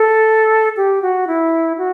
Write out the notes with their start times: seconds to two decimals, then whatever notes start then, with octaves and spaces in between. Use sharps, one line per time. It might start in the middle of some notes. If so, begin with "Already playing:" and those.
Already playing: A4
0.77 G4
1.02 F#4
1.27 E4
1.78 F#4